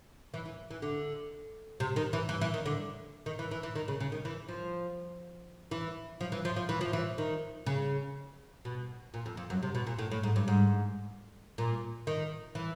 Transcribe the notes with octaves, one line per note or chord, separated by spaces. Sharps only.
E3
E3
E3
D3
C3
D#3
E3
E3
E3
D#3
D3
D#3
E3
E3
E3
D#3
C#3
C#3
D#3
E3
F3
E3
F3
E3
F3
F3
E3
F3
E3
D#3
C#3
B2
A#2
F2
F2
F#2
C3
B2
A#2
A2
A2
G#2
G2
G#2
A#2
D#3
E3